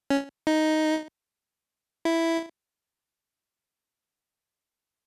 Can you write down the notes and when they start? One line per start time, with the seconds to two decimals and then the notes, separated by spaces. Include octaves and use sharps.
0.10 C#4
0.47 D#4
2.05 E4